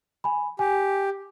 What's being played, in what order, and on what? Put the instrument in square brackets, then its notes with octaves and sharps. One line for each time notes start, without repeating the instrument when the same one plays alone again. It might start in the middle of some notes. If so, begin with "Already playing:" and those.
[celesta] G#5 B5
[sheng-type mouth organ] G4 [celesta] G#5